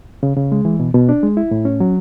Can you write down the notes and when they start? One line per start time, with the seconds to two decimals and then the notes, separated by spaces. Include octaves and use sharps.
0.23 C#3
0.37 C#3
0.52 G#3
0.65 E3
0.80 B2
0.94 B2
1.09 D4
1.23 G#3
1.37 E4
1.51 A2
1.65 C#4
1.80 F#3